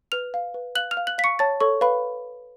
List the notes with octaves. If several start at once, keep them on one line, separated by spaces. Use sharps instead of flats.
B4 F6 F7
F5
B4
F5 F#6 F#7
F6 F7
F5
F#6 F#7
F5 B6
C#6 C#7
C#5 A5 A6
A4 C#5 C#6
B4 F5 B5